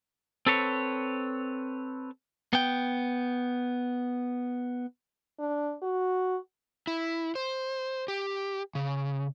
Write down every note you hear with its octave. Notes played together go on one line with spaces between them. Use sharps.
C4 A4 B4 C#5
B3 G5
D4
F#4
E4
C5
G4
C#3